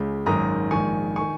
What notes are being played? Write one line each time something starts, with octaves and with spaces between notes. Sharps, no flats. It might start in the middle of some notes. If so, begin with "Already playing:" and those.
Already playing: C#2 C#3
G#1 F#2 D#3 A#5 D#6
A#1 G#2 D#3 G#5 C#6
D#3 G#5 C#6